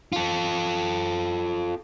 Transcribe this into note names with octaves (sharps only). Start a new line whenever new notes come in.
F4 A4